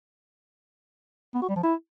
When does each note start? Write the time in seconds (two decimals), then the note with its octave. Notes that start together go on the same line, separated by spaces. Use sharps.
1.35 B3
1.42 F#4
1.49 G3
1.56 F3
1.63 E4